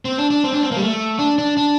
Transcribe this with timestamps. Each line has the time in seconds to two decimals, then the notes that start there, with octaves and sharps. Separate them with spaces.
0.05 C4
0.18 D4
0.31 D4
0.44 C4
0.53 D4
0.63 C4
0.72 A#3
0.76 G3
0.81 A3
1.19 D4
1.39 D4
1.57 D4